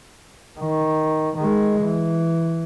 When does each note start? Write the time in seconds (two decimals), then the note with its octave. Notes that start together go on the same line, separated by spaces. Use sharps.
0.59 D#3
1.37 D#3 G#3
1.80 E3